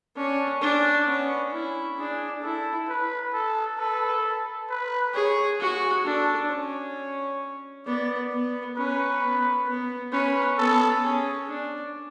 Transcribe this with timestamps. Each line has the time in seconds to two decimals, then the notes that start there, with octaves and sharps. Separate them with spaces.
0.16 C#4 D4
0.61 C#4 D4
1.07 B3 C#4
1.52 C#4 E4
1.98 D4 G#4
2.43 E4 A4
2.88 B4
3.34 A4
3.79 A4 B4
4.70 B4
5.14 G#4 C#5
5.60 F#4 G#4
6.05 D4 A4
6.51 C#4 C#5
7.86 B3 D5
8.32 B3
8.77 C#4 B4
9.23 B3
9.67 B3
10.12 C#4 B4
10.58 B3 A4
11.04 C#4 G#4
11.48 D4